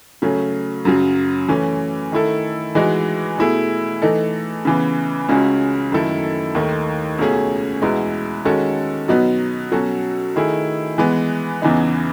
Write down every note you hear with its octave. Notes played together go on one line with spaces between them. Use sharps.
C#3 F#3 A3 C#4
F#2 C#3 F#3
E3 A3 C#4
D#3 A3 E4 A4
E3 G#3 D#4 F#4
B2 A3 E4 G#4
E3 A3 D#4 A4
C#3 E3 B3
C#2 C#3 G#3 C#4 F#4
F#2 D#3 A3 E4 A4
D#2 D#3 A3
C#2 B2 A3 C#4 G#4
E2 B2 G#3 B3 E4
D#3 G#3 C#4 F#4 A4
B2 F#3 B3 D#4
B2 F#3 C#4 F#4 A4
D#3 A3 E4 G#4
E3 G#3 B3
E2 C#3 E3 B3 D#4